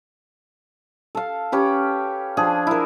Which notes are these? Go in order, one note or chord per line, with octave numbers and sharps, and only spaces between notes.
A4 F5
C#4 G4 B4
F3 D4 G#4
E4 A#4